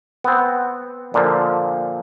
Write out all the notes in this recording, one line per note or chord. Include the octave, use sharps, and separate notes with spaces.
B3 C4
A#2 D3 F3